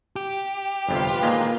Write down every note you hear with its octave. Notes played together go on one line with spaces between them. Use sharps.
G4
G1 F2 C3 F4 B4
A#2 D#3 G#3 A#3